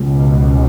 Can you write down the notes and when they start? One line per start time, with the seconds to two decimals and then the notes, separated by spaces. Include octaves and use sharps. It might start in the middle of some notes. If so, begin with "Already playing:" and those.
Already playing: C#2 B2